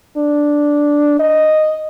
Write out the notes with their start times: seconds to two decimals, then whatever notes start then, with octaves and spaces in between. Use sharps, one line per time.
0.17 D4
1.20 D#5